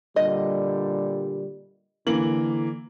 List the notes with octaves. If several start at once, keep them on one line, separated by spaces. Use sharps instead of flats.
A#2 D3 G3 D#5
D3 E3 A#3 F#7